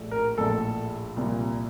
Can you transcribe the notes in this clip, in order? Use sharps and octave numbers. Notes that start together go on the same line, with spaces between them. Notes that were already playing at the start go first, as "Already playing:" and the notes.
Already playing: A#1 A2 F3 A3
A#4
A#1 A2 F3 A3 A4
C2 A#2 F3